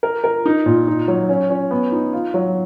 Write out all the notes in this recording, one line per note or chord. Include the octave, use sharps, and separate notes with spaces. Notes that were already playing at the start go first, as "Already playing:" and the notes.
A#4
A#4
D#4
A#2
D#4
F#3
C#4
C#4
B3
D#4
F4
F#3